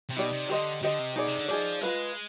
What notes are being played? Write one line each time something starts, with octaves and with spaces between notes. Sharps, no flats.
C3
B2 D#4 G4 D5
C3
D3 G4 C5 D#5
D3 G4 C5 D#5
C3
B2 D#4 G#4 D5
C3
D3
F3 D#4 G#4 D5
G#3 F4 B4 F5